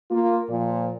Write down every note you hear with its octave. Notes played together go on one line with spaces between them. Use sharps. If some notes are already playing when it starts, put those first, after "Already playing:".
A#3 F4
A#2 F3